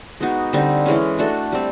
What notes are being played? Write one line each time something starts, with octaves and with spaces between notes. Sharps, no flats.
G#3 B3 D#4 F#4
D3 G3 C4 D#4
E3 G#3 C#4
A3 D4 F#4 A4
G3 C4